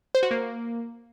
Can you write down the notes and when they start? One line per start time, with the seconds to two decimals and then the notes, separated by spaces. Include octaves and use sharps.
0.15 C5
0.23 F#4
0.31 A#3